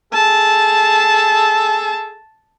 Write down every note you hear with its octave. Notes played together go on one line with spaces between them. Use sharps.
G#4 A4 A5